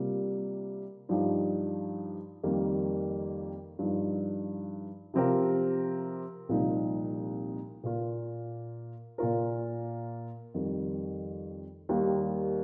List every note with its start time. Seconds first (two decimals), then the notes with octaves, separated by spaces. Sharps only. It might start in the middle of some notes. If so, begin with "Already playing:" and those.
Already playing: C3 G3 A#3 F4
1.09 G2 F3 D#4 G4
2.44 F2 D#3 G3 A#3
3.79 G2 F3 D#4
5.14 C3 F3 C4 G4 A#4
6.49 C2 A#2 F3 A#3 D#4
7.84 A#2 A#3 F4
9.18 A#2 A#3 F4 A#4
10.54 F2 D#3 G3
11.89 D#2 D#3 G3 A#3